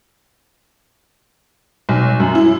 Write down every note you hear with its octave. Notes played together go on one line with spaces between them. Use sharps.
B1
F#2
E4